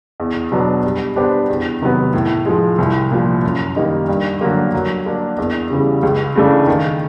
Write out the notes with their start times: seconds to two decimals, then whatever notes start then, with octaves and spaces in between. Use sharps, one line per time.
0.20 E2
0.52 B2 F#3 B3 D4
0.84 G3
1.16 B3 D4 G4 C5
1.49 E2
1.82 C3 D#3 F#3 B3
2.13 A2
2.46 F3 G#3
2.78 C2
3.11 A#2 F3
3.44 F#2
3.76 D#3 G3 A#3 D#4
4.08 G2
4.41 D3 F#3 A#3
4.74 F#3
5.06 A#3 D4
5.38 E2
5.70 C#3 E3 G3
6.03 C#2
6.35 C#3 E3 A3 D4
6.68 D#3